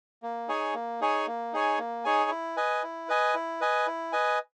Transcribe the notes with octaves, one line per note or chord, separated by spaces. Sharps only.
A#3
D#4 G#4 C#5 G#5
A#3
D#4 G#4 C#5 G#5
A#3
D#4 G#4 C#5 G#5
A#3
D#4 G#4 C#5 G#5
E4
B4 D#5 G#5
E4
B4 D#5 G#5
E4
B4 D#5 G#5
E4
B4 D#5 G#5